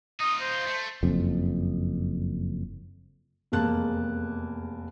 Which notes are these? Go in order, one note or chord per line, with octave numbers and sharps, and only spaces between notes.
D#4 F4 D#6
C5
A3
F#1 F2
F1 E2 G#3 A#3 A5 F#6